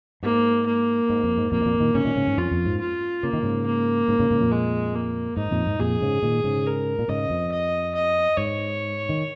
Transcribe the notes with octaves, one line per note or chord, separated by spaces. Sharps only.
G#2 A#3
A#3
G#2
F2
G#2
F2 A#2 A#3
G#2
F2 A#2
A#2 D#3
G#2 C#3 C#4
A#2 D#3
G#2 C#3
G#2
F2 F4
F2
G#2
F4
C#3 A#3
D#3
G#2 C#3
A#3
G#2 C#3
G#2 C#3
G#2 C#3
F2 A#2
G#3
A#3
G#2 D#4
F2 A#2
G#2
F2 A#2 G#4
G#2 C#3
A#2 D#3
G#2 C#3
A#4
A#2
G#2 C#3 D#5
F2
D#5
D#5
G#2 C#5
D#3